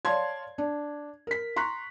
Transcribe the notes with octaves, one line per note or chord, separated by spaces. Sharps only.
C#5 D5 F5 A5 C6 G#6
D4
A#4 B6
A#5 C6 C#6 F#6 B6